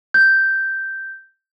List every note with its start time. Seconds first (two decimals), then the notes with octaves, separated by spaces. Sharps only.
0.14 G6